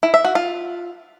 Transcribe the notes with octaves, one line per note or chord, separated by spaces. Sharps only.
E4
E5
F#4
F4